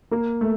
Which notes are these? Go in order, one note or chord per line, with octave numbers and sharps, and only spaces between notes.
A#3
A3